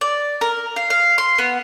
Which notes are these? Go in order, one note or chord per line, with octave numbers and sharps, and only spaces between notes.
D5
A#4
F5
F5
C6
B3